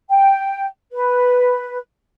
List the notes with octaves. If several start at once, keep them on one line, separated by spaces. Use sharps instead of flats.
G5
B4